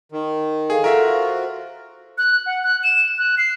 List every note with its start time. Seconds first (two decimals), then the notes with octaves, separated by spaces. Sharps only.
0.12 D#3
0.70 G#4 A4 F5
0.84 F4 F#4 A#4 E5
1.13 C5
2.18 F#6
2.46 F#5
2.63 F#6
2.84 E7
3.18 F#6
3.38 C7